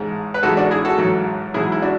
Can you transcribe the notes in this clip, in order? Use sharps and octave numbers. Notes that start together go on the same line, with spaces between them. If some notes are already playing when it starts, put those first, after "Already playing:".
Already playing: A1 G#2 G#3
B4
A1 G#2 G#3 F#4 A4
D4 F#4
E4 G#4
F#4 A4
A1 G#2 F#3
A1 G#2 F#3 E4 G#4
E4
D4 F#4